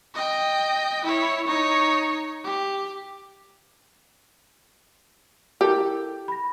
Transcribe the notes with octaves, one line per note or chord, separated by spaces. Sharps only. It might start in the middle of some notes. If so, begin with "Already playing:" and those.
D#5 G5
E4 C#5
D#4 C#5
G4
E4 G4 A4 A#4
B5 A#6